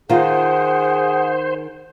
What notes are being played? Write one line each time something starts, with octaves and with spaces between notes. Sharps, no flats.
D#3 F4 G#4 C5 F#5